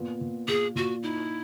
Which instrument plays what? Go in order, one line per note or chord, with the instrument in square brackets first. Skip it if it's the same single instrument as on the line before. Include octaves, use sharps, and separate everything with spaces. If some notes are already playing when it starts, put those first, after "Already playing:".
Already playing: [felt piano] A#2 B3
A#2
[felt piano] A#2 [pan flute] G#4
[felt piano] A#2 [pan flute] F#4
[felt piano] D#4 [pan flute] E4